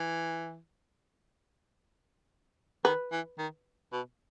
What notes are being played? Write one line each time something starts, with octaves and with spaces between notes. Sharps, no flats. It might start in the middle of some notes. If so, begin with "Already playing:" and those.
Already playing: E3
D#3 B4
E3
D#3
B2